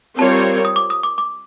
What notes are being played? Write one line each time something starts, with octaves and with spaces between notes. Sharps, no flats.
G3 C4 F4 A#4 C#5 A5
D#6
D6
D#6
D6
D6